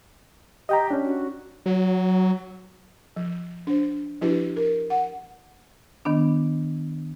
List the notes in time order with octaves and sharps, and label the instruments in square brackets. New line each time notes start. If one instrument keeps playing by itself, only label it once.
[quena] G4 [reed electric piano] D#5 G5 A#5
[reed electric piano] C#4 D4
[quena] F#4
[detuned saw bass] F#3
[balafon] F3
D4 C5
F3 D4 E4 F#4 G4 B4
A#4
F#5
[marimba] D#3 B3 D4